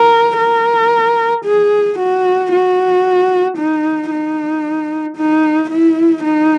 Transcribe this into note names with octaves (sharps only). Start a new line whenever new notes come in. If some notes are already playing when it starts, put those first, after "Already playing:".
Already playing: A#4
A#4
G#4
F#4
F#4
D#4
D#4
D#4
E4
D#4